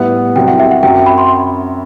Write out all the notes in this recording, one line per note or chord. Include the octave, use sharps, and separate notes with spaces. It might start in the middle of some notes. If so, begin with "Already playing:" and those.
Already playing: A2 G3 B3 E4 B4 F#5
C2 C3 F#3 C4 E4 G5
F#5
E5
F#5
F#2 F#3 C4 G5
B5
C6